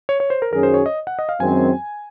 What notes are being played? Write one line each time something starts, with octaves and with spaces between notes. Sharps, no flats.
C#5
C#5
C5
A#4
F#2 D#3 F#3 C#4 G#4 A#4
C5
C#5
D#5
F#5
D#5
F5
F#2 D#3 G#3 C4 G#5